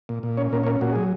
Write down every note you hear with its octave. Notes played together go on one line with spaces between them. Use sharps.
A#2
A#2
C#4 C#5
A#2 A#4
C#5
C#4 A#4
A#2 F#4
F#3 G#4